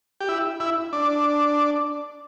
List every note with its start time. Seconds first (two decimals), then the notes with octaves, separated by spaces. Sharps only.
0.20 G4
0.29 E4
0.60 E4
0.93 D4